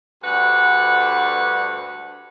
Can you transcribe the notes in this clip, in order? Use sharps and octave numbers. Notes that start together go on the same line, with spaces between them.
D2 G2 B4 F#5